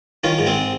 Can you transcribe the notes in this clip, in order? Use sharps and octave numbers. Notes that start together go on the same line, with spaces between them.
D#3 C#4 F4
G#2
G#3 C4